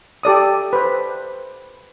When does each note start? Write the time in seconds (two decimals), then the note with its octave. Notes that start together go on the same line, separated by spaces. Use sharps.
0.23 G4 A4 D5 D#6
0.73 B4 C5